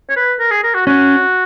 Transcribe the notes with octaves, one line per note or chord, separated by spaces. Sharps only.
C#5
B4
A#4
G#4
A#4
F#4
C#4 F#4